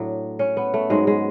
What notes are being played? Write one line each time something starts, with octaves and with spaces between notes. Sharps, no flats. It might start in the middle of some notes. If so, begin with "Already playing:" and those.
Already playing: A2 F#3 D4
C#4
B3
A3
G#2 F#3 G#3
G#3